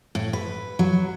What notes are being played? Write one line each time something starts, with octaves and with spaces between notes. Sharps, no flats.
A2
B4
F#3